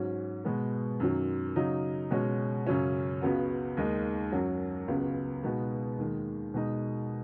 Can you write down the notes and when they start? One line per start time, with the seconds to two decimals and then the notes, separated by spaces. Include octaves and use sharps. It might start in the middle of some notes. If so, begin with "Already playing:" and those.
Already playing: G#2 F#3 C#4 F#4
0.45 B2 G#3 B3
1.00 F#2 D#3 F#3
1.56 C#3 F#3 D#4
2.11 B2 G#3 C#4 F#4
2.67 F#2 C#3 F#3 C#4
3.21 C#2 C#3 B3 F#4
3.77 D#2 D#3 G#3 D#4
4.32 F#2 F#3 C#4 F#4
4.88 C#2 C#3 F#3 B3
5.43 B2 G#3 B3 D#4 F#4
5.98 D#2 D#3 G#3
6.54 B2 G#3 D#4